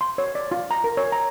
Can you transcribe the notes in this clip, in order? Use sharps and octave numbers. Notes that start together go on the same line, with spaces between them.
C6
C#5
D5
F4
A#5
A#4
C#5
A#5